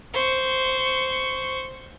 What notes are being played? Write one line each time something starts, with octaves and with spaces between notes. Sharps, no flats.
C5 C#6